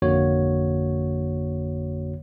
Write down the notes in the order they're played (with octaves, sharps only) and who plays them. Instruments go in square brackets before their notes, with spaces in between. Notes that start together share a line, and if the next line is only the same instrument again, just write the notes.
[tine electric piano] G#1 F2 D3 A#3 F#4 C#5